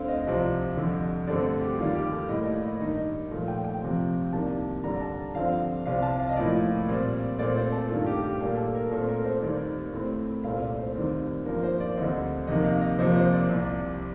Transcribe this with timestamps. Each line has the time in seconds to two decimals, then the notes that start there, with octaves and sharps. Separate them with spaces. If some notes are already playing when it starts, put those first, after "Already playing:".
Already playing: D2 D3 A3 C4 F5
0.08 D#5
0.26 C2 C3 F3 C4
0.76 F2 D3 G3
1.27 G2 D3 A3 C4 D5
1.61 G4
1.78 D#2 D#3 G3 F4
1.95 G4
2.12 A4
2.29 A2 G3 A#3 D#5
2.46 D5
2.63 D#5
2.80 G2 D#3 G3 D#5
3.31 A#2 F3 A3
3.48 G5
3.65 G5
3.82 F2 C3 F3 C4
4.33 C2 C3 D#3 A#3 A5
4.84 G2 D3 G3 A#5
5.01 A5
5.35 G2 D3 F3 C4 F5
5.86 C2 C3 G3 C4 F5
6.02 A5
6.20 F5
6.29 D#5
6.36 A2 F3 A#3 D5
6.88 A#2 G3 C4
7.38 A#2 A3 C4 D5
7.56 C5
7.72 A4
7.89 G2 D#3 A3 F4
8.06 G4
8.24 G4
8.40 A#2 G3 A#3 A4
8.57 A4
8.75 A#4
8.91 A#2 A3 C4 A4
9.08 A#4
9.25 C5
9.42 D#2 D#3 G3 C4 D5
9.93 A2 A3 C4
10.44 C2 A#2 A3 C4 F5
10.61 D5
10.78 C5
10.95 D#2 D#3 G3 C4
11.46 G2 F3 A#3 A#4
11.63 C5
11.80 D5
11.97 D2 D3 G3 C4 D#5
12.47 F2 C3 D#3 A#3 D#5
12.64 F5
12.81 D#5
12.98 F2 C3 F3 A#3 C5
13.16 C5
13.33 D5
13.50 C2 C3 G3